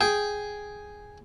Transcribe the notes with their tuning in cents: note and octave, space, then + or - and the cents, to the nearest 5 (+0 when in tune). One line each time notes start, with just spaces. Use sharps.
G#4 +0 G5 +0